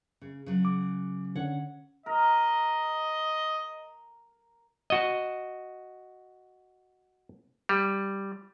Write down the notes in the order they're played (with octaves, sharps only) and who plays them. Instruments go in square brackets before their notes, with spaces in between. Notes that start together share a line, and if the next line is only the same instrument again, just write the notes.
[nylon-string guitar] C#3
C#3 F#3
[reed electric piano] D6
[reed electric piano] D3 C#4 [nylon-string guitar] C#5 F#5
[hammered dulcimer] A#4 [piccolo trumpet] D#5
[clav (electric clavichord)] F#4 D#5
G3